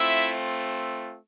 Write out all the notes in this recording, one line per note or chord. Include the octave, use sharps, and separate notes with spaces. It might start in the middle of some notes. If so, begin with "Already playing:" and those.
Already playing: A3 C4 E4 F4 E5